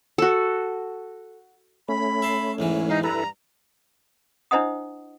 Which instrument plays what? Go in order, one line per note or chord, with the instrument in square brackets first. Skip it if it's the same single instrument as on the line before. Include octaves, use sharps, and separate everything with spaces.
[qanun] F#4 A4
[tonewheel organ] A3 C#4 [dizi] B5
[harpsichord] E5 A5 C6
E2 G#2 E3
[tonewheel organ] G#3 F5 [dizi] D#4
[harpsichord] G2 [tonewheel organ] E4 A4 B4 [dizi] A#5
[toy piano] D4 E4 C5 D#5 F#5 D#6